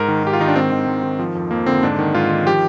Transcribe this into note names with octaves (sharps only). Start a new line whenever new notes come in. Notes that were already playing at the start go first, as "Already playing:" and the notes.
Already playing: G#2 A#4
D#3
G#2 G4
F4
D#3 D#4
D4
G#2 C4
D#3
G#2
D#3
F3
F2
F2 A#3
D3 C4
G#2 D4
D#3
G#2 F4
D#3
F3 G4